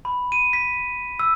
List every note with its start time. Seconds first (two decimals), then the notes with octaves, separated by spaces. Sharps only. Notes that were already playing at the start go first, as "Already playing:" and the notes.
0.05 B5
0.32 D#7
0.53 B6
1.19 E6